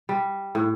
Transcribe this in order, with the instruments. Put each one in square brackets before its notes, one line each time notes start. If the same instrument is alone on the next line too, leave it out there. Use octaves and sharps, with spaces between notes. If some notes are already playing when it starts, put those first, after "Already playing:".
[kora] G3
A2